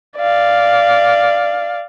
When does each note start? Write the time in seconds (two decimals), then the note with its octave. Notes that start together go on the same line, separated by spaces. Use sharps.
0.17 D5 F5